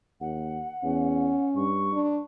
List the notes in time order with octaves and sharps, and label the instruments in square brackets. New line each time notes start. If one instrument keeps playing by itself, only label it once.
[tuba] D#2 [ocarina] F#5
[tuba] E2 [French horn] C#4
[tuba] G2 [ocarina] C#6
[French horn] D4